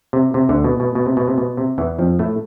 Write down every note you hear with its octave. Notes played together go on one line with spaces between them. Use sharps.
C3
C3
D2 D3
B2
B2
B2
C3
B2
C3
B2
C3
E2 E3
F2 F3
A2 A3